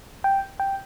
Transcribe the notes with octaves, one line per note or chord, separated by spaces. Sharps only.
G5
G5